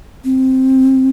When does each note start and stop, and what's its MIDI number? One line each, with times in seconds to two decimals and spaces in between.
0.25 1.10 60